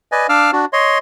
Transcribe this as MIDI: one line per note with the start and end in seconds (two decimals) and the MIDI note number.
0.12 0.27 71
0.12 0.27 74
0.12 0.27 75
0.12 0.27 80
0.29 0.51 62
0.29 0.51 77
0.29 0.51 86
0.29 0.51 88
0.29 0.51 89
0.53 0.65 62
0.53 0.65 66
0.73 0.98 73
0.73 0.98 75
0.73 0.98 84